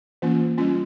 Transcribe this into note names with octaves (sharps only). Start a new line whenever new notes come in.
E3 A#3 C#4 F4
G3 C#4 F4